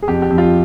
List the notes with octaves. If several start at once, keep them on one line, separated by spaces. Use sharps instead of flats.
G#4
F2 G4
G4
F2
F4